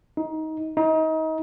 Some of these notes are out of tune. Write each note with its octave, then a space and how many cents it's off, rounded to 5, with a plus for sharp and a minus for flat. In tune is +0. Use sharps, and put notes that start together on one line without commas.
D#4 +20
D#4 +30